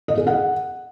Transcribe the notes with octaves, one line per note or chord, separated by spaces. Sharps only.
D#5
G#4
F#5